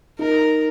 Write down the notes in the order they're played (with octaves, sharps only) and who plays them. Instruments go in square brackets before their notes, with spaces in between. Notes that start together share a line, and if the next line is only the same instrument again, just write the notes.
[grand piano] D#4 [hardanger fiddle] A#4